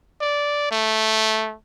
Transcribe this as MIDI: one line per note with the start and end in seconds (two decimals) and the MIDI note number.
0.21 0.71 74
0.71 1.55 57